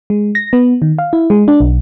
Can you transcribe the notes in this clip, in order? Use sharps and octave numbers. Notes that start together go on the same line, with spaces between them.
G#3
A#6
B3
D#3
F5
E4
G#3
D4
B1